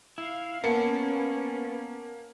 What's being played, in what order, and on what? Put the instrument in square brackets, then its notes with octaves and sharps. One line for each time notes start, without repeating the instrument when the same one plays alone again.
[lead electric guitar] E4 [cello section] F5
[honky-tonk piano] A#3 C#7 [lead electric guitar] B3 [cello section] C#4 [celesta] A#4 F#5 A5